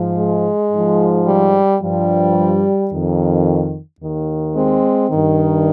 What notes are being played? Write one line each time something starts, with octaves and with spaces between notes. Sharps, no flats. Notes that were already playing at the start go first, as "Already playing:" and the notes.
Already playing: G#2 F3
G#3
G#2 F3
G3
G2 F3 G3
F2 D#3
D#2 D#3
G#3 C4
G2 D#3